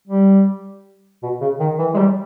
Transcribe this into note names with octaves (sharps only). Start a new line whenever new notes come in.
G3
B2
C#3
D#3
E3
G#3
G3